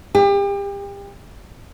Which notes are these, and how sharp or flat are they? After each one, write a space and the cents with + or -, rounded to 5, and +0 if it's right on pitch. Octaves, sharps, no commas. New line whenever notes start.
G4 +35